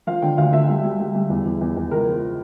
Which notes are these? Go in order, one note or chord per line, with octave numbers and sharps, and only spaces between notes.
F3 F5
D3 G5
D2 F5
D2 E5
G3
G3
G3
G3
E2
E2
E2
E2
C#2 A#4
F3